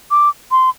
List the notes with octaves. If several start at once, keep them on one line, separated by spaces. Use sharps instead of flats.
D6
C6